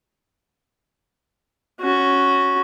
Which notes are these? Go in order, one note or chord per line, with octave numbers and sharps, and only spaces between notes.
C#4 F#4